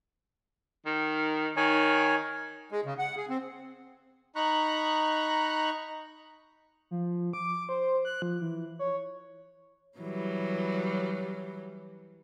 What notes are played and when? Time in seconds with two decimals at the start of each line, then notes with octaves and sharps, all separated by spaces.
0.86 D#3
1.57 D#3 C#5 G#5
2.72 G#3
2.85 C#3
2.99 F#5
3.17 G#4
3.29 C4
4.36 D#4 A#5 B5 C#6 F#6
6.91 F3
7.33 D6
7.69 C5
8.05 F#6
8.22 F3
8.41 E3
8.79 C#5
9.99 E3 F#3 G3